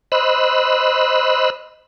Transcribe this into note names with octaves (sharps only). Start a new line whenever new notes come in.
C5 D#5 B5 E6 F#6